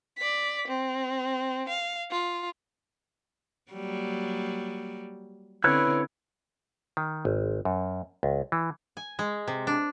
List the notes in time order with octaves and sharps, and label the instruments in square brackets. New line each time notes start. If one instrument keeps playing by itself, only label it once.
[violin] D5 B6
C4
F5
F4
[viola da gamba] F#3 G3 A#3
[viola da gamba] D3 C4 C#4 [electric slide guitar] E4 B4 C#5
[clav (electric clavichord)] D#3
G#1
F#2
C#2
E3
[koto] G#5
G#3
C3
D4